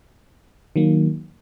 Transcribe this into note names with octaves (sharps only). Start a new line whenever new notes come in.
D#3 F#3 A#3